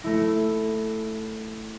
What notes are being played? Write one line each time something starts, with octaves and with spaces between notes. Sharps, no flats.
A3 E4 A#6